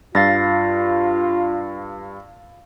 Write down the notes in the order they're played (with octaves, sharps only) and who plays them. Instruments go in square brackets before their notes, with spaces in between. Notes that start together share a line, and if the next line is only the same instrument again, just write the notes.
[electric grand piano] G2 [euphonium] F4 [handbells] F5 A6 A#6